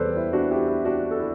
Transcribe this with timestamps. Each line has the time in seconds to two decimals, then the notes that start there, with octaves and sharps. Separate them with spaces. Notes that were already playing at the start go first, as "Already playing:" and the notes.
Already playing: E2 C3 G3 A4 B4 C5 D5
0.16 E4
0.33 D4 F#4
0.51 E4 G4
0.68 E4
0.85 D4 F#4
1.11 A4
1.19 E4